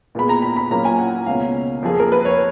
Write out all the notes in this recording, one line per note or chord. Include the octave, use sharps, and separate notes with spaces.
A#2 G#3 B3 B5
A#5
B5
B5
A#2 F#3 A#3 C#4 A#5
G#5
F#5
C#2 B2 A#3 C#4 F5
F2 F3 A#3 G#4
A#4
B4
C#5